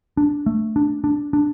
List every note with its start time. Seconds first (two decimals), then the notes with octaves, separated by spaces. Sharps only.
0.17 D4
0.46 A3
0.76 D4
1.04 D4
1.33 D4